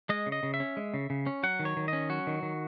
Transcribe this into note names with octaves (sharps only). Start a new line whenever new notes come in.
G#3 D#5
C#3
D#5
C#3
E5
C#4
G#3
C#3
C#3
C#4
F#3 F#5
D#3
C#5
D#3
C#4 D#5
F#3 F#4
D#3
D#3